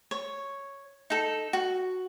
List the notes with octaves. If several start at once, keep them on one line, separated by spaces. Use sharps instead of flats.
C#5
D#4 A4
F#4